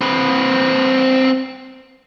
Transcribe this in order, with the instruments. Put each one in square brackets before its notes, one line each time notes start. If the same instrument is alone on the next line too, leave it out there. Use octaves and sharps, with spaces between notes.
[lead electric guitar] C4 B4